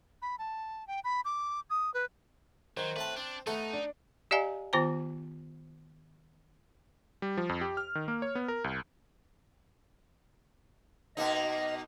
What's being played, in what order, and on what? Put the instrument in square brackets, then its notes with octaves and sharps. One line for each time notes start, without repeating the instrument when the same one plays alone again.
[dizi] B5
A5
G5
B5
D6
D#6
B4
[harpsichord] D#3 [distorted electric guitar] F#3 [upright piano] C5
[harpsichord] A2 C4 A5 [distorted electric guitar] B4
[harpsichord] C4 [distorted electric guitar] D4
[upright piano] A3 [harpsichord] B3 A4 [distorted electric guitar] D#4
[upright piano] D4
[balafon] G4 D5 D#5 F5 G#5 A#5
D#3 B3 F4 C5 G5 A#5
[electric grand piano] G3
F3
F2
G4
F6
D#3
A#3
C#5
B3
A#4
C2
[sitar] B2 A#3 D#4 [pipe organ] D#5